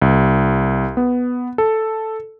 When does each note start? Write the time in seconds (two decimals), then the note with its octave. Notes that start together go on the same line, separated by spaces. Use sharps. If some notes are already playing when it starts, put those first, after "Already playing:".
0.02 C2
0.97 B3
1.58 A4